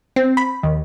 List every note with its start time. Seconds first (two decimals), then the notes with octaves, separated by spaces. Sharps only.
0.16 C4
0.37 B5
0.63 D#2